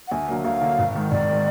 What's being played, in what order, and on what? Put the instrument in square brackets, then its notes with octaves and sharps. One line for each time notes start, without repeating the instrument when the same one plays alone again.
[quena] F#5
[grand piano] D2 [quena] G#5
[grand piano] D3 F#3 A#3
[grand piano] D2 [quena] F5
[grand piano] D3 F#3 A#3
G#1
G#2 D#3 G#3
[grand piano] G#1 [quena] D5
[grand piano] D#3 G#3